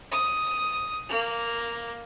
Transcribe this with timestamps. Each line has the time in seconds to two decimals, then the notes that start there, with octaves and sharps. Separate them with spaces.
0.11 D#6
1.09 A#3